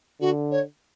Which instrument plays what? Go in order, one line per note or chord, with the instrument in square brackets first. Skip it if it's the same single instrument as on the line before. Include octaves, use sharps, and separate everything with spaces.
[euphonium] D3 [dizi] F#4
[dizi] C#5